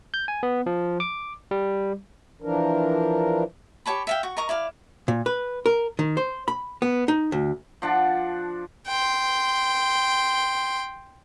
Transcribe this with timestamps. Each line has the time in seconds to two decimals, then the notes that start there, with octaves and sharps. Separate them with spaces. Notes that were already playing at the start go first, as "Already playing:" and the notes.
0.14 G6
0.28 G#5
0.43 B3
0.66 F3
1.00 D6
1.51 G3
2.42 E3 F3 D4 A#4
3.86 G4 C#5 A5 B5
4.07 E5 F5 G5
4.23 F#4 C#6
4.37 A#4 D#5 A#5 C#6
4.49 E4 D5 F5
5.08 A#2
5.26 B4
5.66 A#4
5.99 D#3
6.17 C5
6.48 B5
6.82 B3
7.08 D#4
7.32 D2
7.82 F3 D4 F#5 A5
8.87 G5 C6